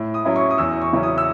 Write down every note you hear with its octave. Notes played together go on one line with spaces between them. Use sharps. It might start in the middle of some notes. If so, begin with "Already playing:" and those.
Already playing: A2
D#6
F#3 C#4 E4
C#6
D#6
E2 E6
C#6
C#3 F#3 C#4 E4
D#6
E6